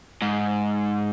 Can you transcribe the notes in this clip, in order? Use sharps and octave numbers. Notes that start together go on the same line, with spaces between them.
G#2